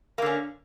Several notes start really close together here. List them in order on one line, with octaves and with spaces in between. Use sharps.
A#3 D3 C#4